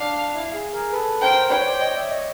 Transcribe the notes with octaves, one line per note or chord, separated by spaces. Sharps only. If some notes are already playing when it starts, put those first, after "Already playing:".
Already playing: D4 F5
E4
G#4
G#4 A#4
A4 B4
A#4 C5 G5
B4 C#5 G5
C5 D5
C#5 D#5
D5 E5
C#5 D#5